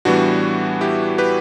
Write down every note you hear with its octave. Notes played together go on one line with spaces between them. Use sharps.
A2 E3 G3 B3 D4 F#4
E4 G4
G4 B4